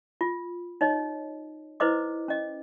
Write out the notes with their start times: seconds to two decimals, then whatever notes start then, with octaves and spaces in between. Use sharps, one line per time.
0.21 F4
0.81 D#4 C#5 D#5
1.80 E4 B4 C5 D#5 D6
2.28 C#4 D#5